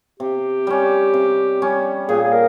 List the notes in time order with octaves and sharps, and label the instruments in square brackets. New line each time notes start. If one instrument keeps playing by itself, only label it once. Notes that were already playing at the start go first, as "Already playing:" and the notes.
[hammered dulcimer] C3 [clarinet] G4
[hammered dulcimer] G3 C#4
C3
G3 C#4
[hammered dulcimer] A#2 [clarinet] G#4
[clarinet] G#4
A#4